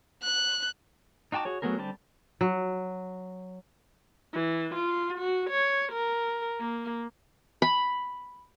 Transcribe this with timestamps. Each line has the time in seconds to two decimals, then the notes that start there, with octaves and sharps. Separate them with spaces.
0.23 F#6
1.32 D#4 F#4 G5 A5 D6
1.45 F#4 G#4 C#5
1.62 F#3 A3 B3 G#4 A#4
1.78 D3 G3 C4 G4 A5
2.41 F#3
4.33 E3
4.75 F4
5.18 F#4
5.50 C#5
5.92 A#4
6.60 A#3
7.62 B5